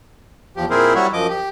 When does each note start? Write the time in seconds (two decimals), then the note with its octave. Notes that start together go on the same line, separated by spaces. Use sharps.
0.56 E2 F3 G4
0.70 A#2 C4 E4 G#4 A#4 C5
0.95 F#3 G3 E4 F#4 C#5
1.13 F#2 F3 D#5 D6
1.29 G4